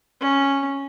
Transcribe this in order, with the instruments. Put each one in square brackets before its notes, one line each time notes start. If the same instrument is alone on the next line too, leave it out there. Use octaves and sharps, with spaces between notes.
[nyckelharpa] C#4